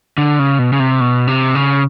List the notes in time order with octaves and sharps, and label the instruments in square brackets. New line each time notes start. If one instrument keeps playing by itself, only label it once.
[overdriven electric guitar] D3
C#3
B2
C#3
C3
B2
C3
C#3